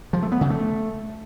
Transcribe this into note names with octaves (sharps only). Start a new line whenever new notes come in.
F3
A3
B3
C#3
A3